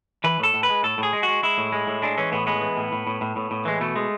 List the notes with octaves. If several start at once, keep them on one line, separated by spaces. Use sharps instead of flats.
E3 B4
A2 A4
A2
B4
G#3
A2 A4
A2 G#4
G#3
G#3 F#4
G#3 E4
A2
G#3
A2
G#3 D4
E3 C#4
A2 B3
G#3 B3
E3
A2
A2
A2
A2
A2
A2
E3 G#3
B2 A3
G#3